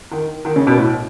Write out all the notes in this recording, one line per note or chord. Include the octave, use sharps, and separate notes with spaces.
D#3
D#3
C#3
B2
A2